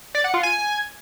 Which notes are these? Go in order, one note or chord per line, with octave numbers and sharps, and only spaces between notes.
D5
F#5
F4
G#5